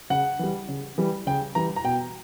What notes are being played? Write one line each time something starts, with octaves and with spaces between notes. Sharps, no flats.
C#3 F#5
E3 G3
C#3
E3 G3
C#3 G5
E3 G3 A#5
A#5
B2 G5